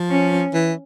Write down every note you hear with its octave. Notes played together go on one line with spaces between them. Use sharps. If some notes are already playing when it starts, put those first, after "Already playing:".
Already playing: F3
C#4
E3